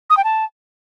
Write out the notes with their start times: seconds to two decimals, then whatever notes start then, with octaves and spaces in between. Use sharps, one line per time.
0.10 D#6
0.17 G5
0.24 A5